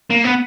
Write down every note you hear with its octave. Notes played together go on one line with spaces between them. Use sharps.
A#3
B3